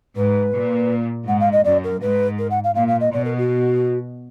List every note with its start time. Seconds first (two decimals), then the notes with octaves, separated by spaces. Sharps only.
0.17 G#2 B4
0.54 A#2
1.27 G#2 F#5
1.40 F5
1.52 D#5
1.65 F#2 D5
1.84 A#4
2.01 G#2 B4
2.39 A#4
2.51 F#5
2.64 F5
2.75 A#2 F5
2.88 F5
3.00 D#5
3.12 B2 D5
3.25 A#4
3.38 F#4